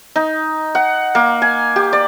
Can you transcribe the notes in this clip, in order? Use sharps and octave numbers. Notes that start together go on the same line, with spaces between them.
D#4
F#5
A#3
G#5
G4
D5